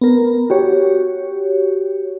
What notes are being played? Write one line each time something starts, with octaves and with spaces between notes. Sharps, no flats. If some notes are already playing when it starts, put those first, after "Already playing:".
B3 A#4
F#4 G4 C#5